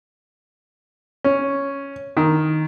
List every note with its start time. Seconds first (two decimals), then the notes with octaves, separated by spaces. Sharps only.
1.24 C#4
2.17 D#3